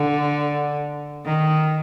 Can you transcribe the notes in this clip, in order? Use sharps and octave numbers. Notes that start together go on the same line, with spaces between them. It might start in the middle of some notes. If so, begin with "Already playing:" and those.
Already playing: D3
D#3